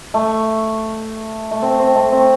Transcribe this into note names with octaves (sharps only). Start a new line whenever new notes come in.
A3
A3
C4
C4
A3
C4